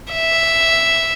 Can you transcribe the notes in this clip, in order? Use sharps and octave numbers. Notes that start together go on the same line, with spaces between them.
E5